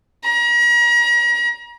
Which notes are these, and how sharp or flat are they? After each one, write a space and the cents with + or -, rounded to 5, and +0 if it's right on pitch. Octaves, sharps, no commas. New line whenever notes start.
A#5 +40